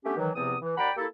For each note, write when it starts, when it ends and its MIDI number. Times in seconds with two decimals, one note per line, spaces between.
0.05 0.17 57
0.05 0.17 59
0.05 0.17 61
0.05 0.17 62
0.05 0.17 67
0.17 0.30 51
0.17 0.30 52
0.17 0.30 54
0.35 0.56 40
0.35 0.56 48
0.35 0.56 53
0.35 0.56 59
0.35 0.56 60
0.35 0.56 87
0.62 0.76 52
0.78 0.90 39
0.78 0.90 74
0.78 0.90 78
0.78 0.90 79
0.78 0.90 82
0.78 0.90 83
0.97 1.06 58
0.97 1.06 64
0.97 1.06 67
0.97 1.06 69